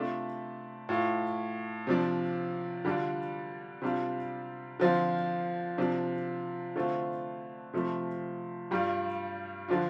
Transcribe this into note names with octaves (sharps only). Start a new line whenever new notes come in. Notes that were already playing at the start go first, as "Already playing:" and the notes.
Already playing: C3 A3 D4 F4
A2 A3 F4
C3 F3 D4
D3 G3 D4 F4
C3 G3 D4 F4
D3 F3 C4 F4
C3 F3 D4
D3 A3 C4 F4
C3 F3 A3
G2 G3 F4
D3 F3 D4 F4